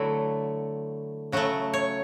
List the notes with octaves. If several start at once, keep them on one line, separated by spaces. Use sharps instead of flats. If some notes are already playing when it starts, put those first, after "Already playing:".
Already playing: D3 F#3 A3 E4 F#4
C#3 F#3 A3 F#4
C#5